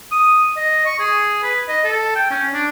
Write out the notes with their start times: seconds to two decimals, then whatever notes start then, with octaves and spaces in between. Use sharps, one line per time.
0.11 D#6
0.56 D#5
0.86 C#6
0.99 G#4
1.43 B4
1.68 D#5
1.84 A4
2.15 G5
2.31 C#4
2.53 D4